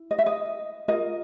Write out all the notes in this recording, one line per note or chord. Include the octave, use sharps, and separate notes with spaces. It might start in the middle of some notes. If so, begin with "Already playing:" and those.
Already playing: E4
D#5
E5
D#5
F4 A#4 D#5